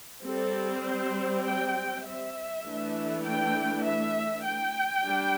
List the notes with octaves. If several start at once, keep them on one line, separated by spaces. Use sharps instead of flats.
G3 C4 A4
C5
G5
E5
E3 A3 D4
G5
E5
G5
G3 D4